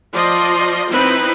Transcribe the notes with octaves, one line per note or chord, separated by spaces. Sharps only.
F3 D5 D#5 C6
C4 D#4 E4 B4